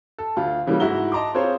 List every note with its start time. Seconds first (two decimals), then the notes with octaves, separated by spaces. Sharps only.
0.18 A4
0.37 D2 F4
0.67 C#3 E3 F#3 G3 A#3
0.80 G#2 E4 F#4 A#5 G7
1.12 D#5 A5 A#5 C6 D6
1.34 C4 F4 G#4 C5 C#5